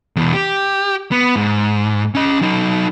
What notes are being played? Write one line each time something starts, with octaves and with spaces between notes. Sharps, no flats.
E2 B2
G4
B3
G#2
C#4 D#5
F#3 D#4